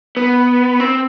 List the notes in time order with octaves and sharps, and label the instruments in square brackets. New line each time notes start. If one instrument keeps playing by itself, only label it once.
[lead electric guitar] B3
C4